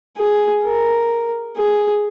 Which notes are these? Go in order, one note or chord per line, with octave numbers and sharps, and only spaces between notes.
G#4
A#4
G#4